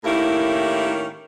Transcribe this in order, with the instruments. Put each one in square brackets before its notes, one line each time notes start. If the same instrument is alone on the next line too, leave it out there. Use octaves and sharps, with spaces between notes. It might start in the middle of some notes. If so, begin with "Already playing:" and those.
[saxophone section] A2 D#3 A#3 C#4 E4 G4